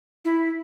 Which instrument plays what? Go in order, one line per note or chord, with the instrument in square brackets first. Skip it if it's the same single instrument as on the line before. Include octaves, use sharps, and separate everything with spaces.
[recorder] E4